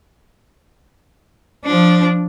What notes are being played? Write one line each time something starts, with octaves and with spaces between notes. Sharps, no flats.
F3 D4